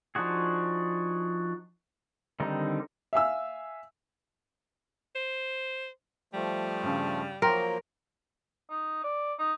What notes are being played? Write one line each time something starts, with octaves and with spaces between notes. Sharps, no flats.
F3 D4 D#4 F#4 G#4
D3 D#3 G3 C4 D#4
E5 F5 G#5 E6
C5
F3 G3 A3
G2 C#3
F3 F#3 A#3 A#4 G5 A#5 C6
D#4
D5
D#4